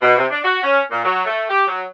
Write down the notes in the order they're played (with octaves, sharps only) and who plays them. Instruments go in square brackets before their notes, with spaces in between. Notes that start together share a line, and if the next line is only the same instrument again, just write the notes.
[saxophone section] B2
C3
D4
F#4
C#4
A#2
F#3
A3
G4
F#3